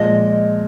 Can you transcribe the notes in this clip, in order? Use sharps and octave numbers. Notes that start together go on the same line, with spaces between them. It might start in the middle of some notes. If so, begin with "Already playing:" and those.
Already playing: A#2 F3 G#3 D#5